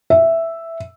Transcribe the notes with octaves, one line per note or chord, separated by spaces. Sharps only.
E5